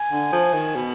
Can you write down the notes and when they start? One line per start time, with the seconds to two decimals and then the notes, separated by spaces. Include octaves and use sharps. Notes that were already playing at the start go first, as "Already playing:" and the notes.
Already playing: G#5
0.12 D3
0.32 F3
0.54 D#3
0.75 B2